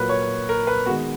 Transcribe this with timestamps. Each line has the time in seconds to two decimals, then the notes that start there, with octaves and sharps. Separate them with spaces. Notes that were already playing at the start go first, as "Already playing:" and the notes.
Already playing: A#2 F#3 A#3 B4
0.09 C#5
0.49 A#4
0.67 B4
0.86 D#3 G#3 B3 F#4